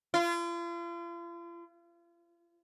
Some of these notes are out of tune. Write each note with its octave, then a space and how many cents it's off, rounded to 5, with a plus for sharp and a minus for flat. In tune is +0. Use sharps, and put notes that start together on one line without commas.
F4 -40